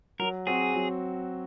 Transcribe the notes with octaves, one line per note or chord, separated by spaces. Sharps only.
F#3 A#4
C4 F#4 G#4
F#3